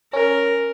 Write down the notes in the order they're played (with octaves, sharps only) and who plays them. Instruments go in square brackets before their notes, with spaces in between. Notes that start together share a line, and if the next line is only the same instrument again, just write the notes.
[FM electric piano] C#4 [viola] A#4